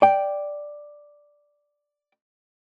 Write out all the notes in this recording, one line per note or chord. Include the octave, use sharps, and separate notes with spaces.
D5 G5